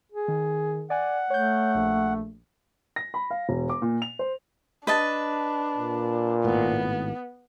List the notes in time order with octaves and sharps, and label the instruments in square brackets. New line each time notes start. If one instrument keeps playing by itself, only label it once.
[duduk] G#4
[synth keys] D#3
[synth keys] D5 G#5 [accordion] F#5
[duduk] A3 [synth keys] C#5 G6
[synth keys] A#1
[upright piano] A#6
B5
F5
E1
D6
A#2
F7
C5
[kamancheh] D4 [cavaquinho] B4 D#5 A5
[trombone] A#2
[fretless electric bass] G#1 A2 [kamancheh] B3